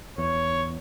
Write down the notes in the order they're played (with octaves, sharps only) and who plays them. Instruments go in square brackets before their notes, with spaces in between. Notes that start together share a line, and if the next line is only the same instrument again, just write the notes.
[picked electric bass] E2 [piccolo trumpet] C#5